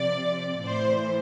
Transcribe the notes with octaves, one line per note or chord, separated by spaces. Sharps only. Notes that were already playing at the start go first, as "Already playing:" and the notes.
Already playing: C3 F3 D5
A2 E3 C5